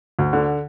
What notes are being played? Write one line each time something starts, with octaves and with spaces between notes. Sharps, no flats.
D2
D3